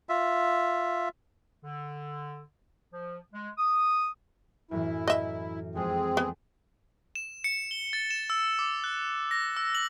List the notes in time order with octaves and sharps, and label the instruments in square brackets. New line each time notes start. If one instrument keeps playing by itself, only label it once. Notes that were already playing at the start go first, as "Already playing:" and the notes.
[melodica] F4 E5
[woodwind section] D3
F3
G#3
D#6
[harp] F#2 A2 E3 [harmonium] E4
[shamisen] D#5 E5
[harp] F2 G#3 [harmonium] C4 G#4
[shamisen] B3
[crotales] E7
C#7
G7
A6
E7
E6
D6
F#6
A#6
E6
F#7